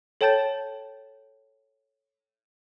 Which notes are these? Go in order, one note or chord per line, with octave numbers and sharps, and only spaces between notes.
A4 C#5 G5 A5 G6 A6